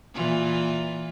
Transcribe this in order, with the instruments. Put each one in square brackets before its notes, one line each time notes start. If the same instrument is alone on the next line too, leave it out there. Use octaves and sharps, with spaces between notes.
[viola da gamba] A#2 E3 F4